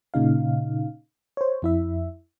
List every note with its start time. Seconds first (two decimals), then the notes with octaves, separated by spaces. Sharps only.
0.14 A#2 C#3 D#4 F5
1.37 C5 C#5
1.62 F2 E4 E5